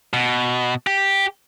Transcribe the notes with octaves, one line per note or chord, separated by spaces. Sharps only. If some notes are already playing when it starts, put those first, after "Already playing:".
B2
G4